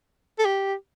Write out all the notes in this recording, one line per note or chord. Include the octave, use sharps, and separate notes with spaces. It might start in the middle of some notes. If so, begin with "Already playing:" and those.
A4
G4